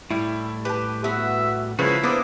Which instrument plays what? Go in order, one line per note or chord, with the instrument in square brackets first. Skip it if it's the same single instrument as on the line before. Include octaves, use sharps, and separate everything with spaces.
[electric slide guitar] A2 G3 [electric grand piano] E4
[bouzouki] G4 A5 [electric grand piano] B4
[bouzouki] B3 F#4 [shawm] E5
[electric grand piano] C#3 F3 B4 [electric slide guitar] G#3 A#3 F#4 [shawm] E4
[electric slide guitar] A#3 D4 [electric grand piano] B3 D6 D#6 [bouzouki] B4 C5